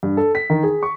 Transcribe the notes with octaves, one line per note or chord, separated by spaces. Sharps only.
G2
A4
B6
D#3
G#4
C#6